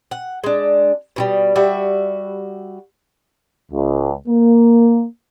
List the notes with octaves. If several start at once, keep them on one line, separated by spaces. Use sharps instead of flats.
F#5
G#3 D4
B2 E3 G3
G3 F#4 E5
C#2
A#3